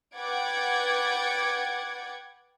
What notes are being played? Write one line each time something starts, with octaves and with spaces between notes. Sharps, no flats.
B4 F#5 G5 D6 G#6 A6